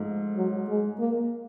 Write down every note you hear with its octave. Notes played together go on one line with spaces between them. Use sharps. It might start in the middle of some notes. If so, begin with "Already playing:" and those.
Already playing: G#2 F3 A3
F#3
G#3
A#3